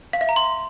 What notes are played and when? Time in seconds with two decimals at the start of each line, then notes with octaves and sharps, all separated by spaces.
0.13 F5
0.21 E5
0.29 A#5
0.36 C6